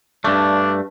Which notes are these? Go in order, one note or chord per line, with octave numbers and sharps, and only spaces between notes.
G2 A3 D4